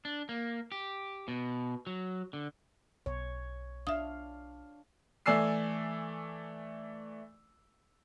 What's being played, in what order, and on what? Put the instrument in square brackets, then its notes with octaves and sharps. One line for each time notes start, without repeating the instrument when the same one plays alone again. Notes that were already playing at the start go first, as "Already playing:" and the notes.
[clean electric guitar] D4
A#3
G4
B2
F#3
D3
[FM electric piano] B1 [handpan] C#5
[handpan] D4 F5 [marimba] E5 D#6
[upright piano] E3 A3 D5 G#5 E6 C7